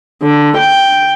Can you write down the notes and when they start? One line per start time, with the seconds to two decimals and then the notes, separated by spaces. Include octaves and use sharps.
0.22 D3
0.57 G5